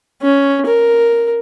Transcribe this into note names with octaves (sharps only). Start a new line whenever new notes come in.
C#4
A#4